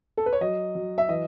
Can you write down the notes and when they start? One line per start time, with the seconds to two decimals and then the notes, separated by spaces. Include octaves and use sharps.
0.17 A4
0.26 B4
0.33 C#5
0.41 F#3 D#5
0.75 F#3
0.98 E5
1.09 E3 D#5